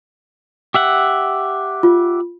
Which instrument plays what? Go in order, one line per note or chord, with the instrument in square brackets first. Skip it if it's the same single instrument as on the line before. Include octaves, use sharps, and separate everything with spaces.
[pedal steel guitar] G4 E5 F#5
[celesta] F4